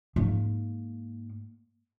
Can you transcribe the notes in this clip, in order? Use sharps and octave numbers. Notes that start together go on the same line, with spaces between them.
G#2 A#3